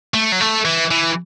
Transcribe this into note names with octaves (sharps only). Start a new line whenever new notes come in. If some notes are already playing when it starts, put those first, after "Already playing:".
A3
F#3
A3
E3
E3